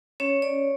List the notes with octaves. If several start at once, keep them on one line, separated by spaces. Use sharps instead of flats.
C#4 C#5
D5